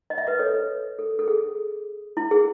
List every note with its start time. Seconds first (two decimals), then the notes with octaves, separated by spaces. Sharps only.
0.10 D#5
0.18 E5
0.27 B4 D#5
0.39 A4 C#5
0.54 B4
0.99 A4
1.19 A4
1.28 G#4
2.17 E4
2.31 G#4